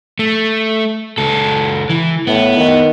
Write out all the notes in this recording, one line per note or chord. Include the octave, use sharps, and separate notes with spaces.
A3
C#2 A4
E3
A2 B3
D#3